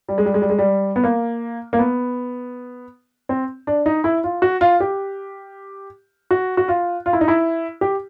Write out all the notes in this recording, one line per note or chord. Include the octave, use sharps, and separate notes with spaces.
G3
G#3
G3
G#3
G3
G#3
G3
B3
A#3
A#3
B3
C4
D4
D#4
E4
F4
F#4
F4
G4
F#4
F#4
F4
F4
E4
D#4
E4
G4